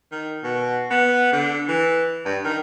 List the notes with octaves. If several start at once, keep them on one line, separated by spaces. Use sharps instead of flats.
D#3
B2
B3
D3
E3
G2
D#3